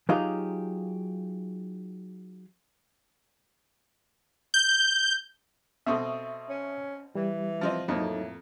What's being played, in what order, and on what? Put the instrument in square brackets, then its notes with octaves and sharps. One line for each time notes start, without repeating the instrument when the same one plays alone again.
[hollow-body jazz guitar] F#3 D#4 F4 G4 G#4 F5
[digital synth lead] G6
[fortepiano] B2 C4 A4 [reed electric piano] E5 C#6 D#6
[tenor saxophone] C#4
[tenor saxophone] E3 [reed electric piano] G3
[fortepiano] F3 C4 D#5
[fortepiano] F2 A#3 [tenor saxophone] A2 [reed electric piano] F#3 D#4